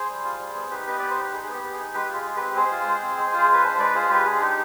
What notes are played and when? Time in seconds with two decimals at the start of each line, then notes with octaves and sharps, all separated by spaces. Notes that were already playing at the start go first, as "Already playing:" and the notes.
Already playing: G#4 C5
0.09 G3
0.24 F4
0.39 G3
0.55 B3
0.70 D#4 G4 B4
0.87 B3 D#5
0.99 B3 D5
1.10 C5
1.17 D#4 B4
1.33 D#4 G#4
1.43 G#4
1.48 B3
1.53 G4
1.63 B3
1.74 G#4
1.79 D#4
1.94 G#3 G4 B4
2.09 F4
2.14 G#4
2.25 G#3
2.36 C4 G4 B4
2.56 G#3 G#4 C5
2.71 F4
2.86 G#3
3.02 C4
3.17 G#3
3.33 F4 G#4
3.48 G#3 B4
3.64 D4 C5
3.79 G#3 B4 D5
3.95 F4 G#4 C5
4.10 G#3 G4 B4
4.26 D4 G#4
4.41 D#4 G4